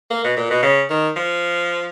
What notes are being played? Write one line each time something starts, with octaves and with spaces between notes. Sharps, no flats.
A#3
B2
A#2
B2
C#3
D#3
F3